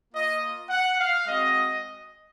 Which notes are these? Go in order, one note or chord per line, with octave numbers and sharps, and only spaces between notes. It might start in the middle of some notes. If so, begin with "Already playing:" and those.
A#3 F4 D#5
F#5
F5
G#3 C4 F#4 D#5